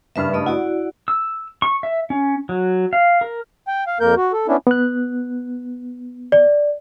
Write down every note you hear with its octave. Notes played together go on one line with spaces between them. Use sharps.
F#1 G2 G3 B4 E5 F6
A3 D#5 D#6
E4 F#4 D5 F#5
E6
C#6
E5
C#4
F#3
F5
A#4
G5
F5
F2 A#3 A#4 G6
F#4
A4
B3 C#4 D4 E4
B3 F#6
D5